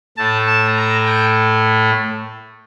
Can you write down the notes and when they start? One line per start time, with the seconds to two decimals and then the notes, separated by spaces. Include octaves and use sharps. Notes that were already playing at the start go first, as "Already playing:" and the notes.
0.17 A2 A3 A5
0.47 A5
0.77 A#5
1.05 G5